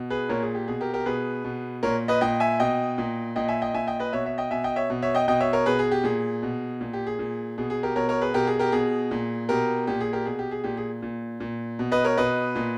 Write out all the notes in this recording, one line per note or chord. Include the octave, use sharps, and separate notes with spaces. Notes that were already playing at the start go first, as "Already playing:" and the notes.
Already playing: B2
G#4 B4
A#2 A#4 C#5
G#4
G4
B2 G#4
G4 A#4
G4 A#4
B2 G#4 B4
B2
A#2 A#4 C#5
B4 D#5
A#2 D#5 G5
E5 G#5
B2 D#5 G5
A#2
A#2 D#5 G5
E5 G#5
D#5 G5
A#2 E5 G#5
D#5 G5
B4 D#5
B2 C#5 E5
C#5 E5
D#5 G5
B2 E5 G#5
D#5 G5
C#5 E5
B2
C#5 E5
D#5 G5
B2 D#5 G5
C#5 E5
A#4 C#5
B2 G#4 B4
G#4
G4
A#2 G#4
B2
A#2
G4
G#4
A#2
B2 G#4
G#4
G4 A#4
B2 A#4 C#5
A#4 C#5
G#4 B4
B2 G4 A#4
G#4
G4 A#4
B2 G#4
A#2
B2 G4 A#4
A#2 G4
G#4
G4 A#4
B2 G#4
G4
G#4
A#2 G4
G#4
A#2
A#2
B2
B4 D#5
A#4 C#5
B2 B4 D#5
A#2